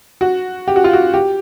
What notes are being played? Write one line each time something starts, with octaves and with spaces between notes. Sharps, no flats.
F#4
G4
F#4
F4
F#4
G4